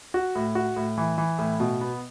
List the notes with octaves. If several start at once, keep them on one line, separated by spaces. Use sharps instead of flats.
F#4
A2
F#4
A2
E3
E3
A2
B2
B3